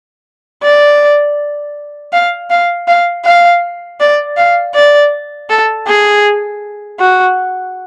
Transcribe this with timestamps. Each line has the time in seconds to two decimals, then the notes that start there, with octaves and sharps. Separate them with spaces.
0.63 D5
2.13 F5
2.50 F5
2.88 F5
3.25 F5
4.00 D5
4.37 F5
4.75 D5
5.49 A4
5.87 G#4
6.99 F#4